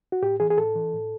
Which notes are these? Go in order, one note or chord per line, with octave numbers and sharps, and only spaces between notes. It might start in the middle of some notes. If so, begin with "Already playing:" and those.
F#4
A2 G4
E3 G#4
G#4
A2 A4
E3
A2